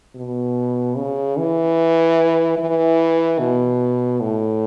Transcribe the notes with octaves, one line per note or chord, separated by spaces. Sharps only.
B2
C#3
E3
E3
B2
A2